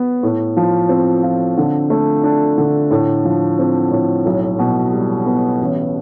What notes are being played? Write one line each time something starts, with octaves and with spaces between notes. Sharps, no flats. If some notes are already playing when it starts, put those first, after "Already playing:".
Already playing: B3
A2
F3
C4
F4
D3
A3
D4
D3
A2
F3
C4
A2
B1
B2
G3
B3
A1